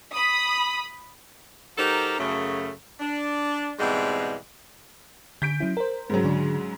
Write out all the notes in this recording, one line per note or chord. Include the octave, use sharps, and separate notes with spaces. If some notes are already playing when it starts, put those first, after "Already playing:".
B5 D#6
F#3 D#4 G4 A4 A#4 C5
F#2 C#3 A3
D4
G#2 B2 E3 G3 G#3 C4
D3 G6 B6 D7
F#3 C#4 E4
A#4 C5
G#2 C#3 F#3
D3 D4